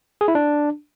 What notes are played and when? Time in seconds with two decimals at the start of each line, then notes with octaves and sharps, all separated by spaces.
0.21 G#4
0.28 E4
0.35 D4